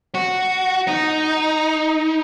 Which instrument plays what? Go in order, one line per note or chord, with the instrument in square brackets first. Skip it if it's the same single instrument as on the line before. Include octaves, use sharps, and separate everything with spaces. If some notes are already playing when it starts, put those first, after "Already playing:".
[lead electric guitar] F#4
D#4